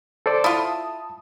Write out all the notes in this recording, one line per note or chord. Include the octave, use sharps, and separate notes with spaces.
A4 C5 D5
E4 F4 A5 D#6